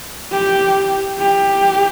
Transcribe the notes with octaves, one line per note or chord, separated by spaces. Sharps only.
G4
G4